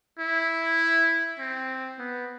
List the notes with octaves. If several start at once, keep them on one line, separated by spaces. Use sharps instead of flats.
E4
C4
B3